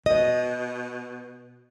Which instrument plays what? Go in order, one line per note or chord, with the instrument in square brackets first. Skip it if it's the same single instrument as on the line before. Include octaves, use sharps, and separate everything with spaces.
[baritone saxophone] B2 [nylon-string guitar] D#5